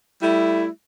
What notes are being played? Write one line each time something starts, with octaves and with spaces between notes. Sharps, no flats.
G3 A3 E4